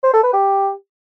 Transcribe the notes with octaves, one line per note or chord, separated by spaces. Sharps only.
C5
A4
B4
G4